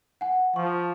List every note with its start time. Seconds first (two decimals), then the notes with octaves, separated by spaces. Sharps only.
0.21 F#5 G#5
0.56 F3 C#6